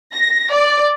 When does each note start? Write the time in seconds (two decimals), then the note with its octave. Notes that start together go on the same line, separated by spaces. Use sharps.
0.13 A#6
0.53 D5